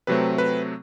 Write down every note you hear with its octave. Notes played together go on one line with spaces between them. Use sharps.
C3 F#3 A3 C4 B4
B4